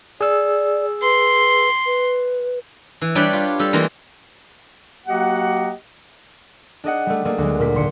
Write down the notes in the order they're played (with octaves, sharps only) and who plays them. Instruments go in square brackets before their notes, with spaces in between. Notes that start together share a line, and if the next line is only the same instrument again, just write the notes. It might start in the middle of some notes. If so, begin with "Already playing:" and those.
[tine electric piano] G#4 E6 [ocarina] D5
[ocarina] B4 [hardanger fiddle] C6
[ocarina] B4
[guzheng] E3
G3 D4 G4 B4 C#5 D5
F4
G3 A4
E3 G#3 A#3 F4 A#4
[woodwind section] F#3 A#3 F#4 G4 D#5 F#5
[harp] D4 G#4 D#5 F#5
G3 A3
A3 A#3 D4 G#4
D2 F#3 G#3
A#2 A#3 B6
G#1 D3 C6 C#7